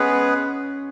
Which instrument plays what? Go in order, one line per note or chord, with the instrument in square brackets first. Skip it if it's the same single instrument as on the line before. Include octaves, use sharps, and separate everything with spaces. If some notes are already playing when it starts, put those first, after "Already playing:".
Already playing: [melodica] G#3 B3 G#4 B4 [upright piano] C#4